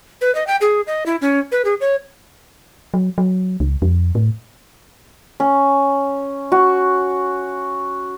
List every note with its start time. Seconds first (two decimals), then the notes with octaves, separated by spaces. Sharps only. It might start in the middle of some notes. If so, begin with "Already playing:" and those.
0.21 B4
0.35 D#5
0.47 G5
0.61 G#4
0.87 D#5
1.06 E4
1.21 C#4
1.52 B4
1.65 G#4
1.81 C#5
2.94 F#3
3.18 F#3
3.60 C#2
3.82 F2
4.15 A2
5.40 C#4
6.52 F#4